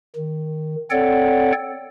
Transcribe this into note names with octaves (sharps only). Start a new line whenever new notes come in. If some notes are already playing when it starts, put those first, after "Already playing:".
D#3
C4 A4 C#5 D5 F#5 G5